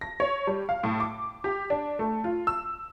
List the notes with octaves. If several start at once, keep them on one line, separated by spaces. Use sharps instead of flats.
A#6
C#5
G3
F5
A2
D6
G4
D4
A3
F4
E6